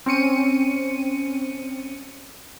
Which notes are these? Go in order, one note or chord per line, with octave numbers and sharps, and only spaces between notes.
C4 C#4 C#7 D#7